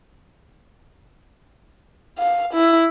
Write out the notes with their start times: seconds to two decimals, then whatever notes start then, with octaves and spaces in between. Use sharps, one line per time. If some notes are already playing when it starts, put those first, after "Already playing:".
2.18 F5
2.53 E4